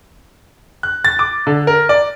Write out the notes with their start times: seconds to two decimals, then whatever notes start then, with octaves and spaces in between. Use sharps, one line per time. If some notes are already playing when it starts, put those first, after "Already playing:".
0.83 F#6
1.05 A6
1.19 D6
1.47 D3
1.67 A#4
1.89 D5